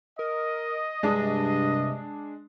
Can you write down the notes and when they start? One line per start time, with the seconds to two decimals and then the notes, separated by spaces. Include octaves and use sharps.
0.19 A#4 D#5
1.03 G2 C3 G#3 D4